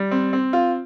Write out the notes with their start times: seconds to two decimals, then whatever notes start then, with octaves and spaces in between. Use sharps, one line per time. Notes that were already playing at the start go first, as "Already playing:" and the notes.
Already playing: G3
0.11 C4
0.33 C4
0.53 F4